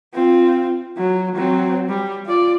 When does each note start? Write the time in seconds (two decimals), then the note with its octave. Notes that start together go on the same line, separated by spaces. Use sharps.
0.14 C4 F4
0.98 F#3
1.35 F#3 C4
1.89 G3
2.26 F4 D5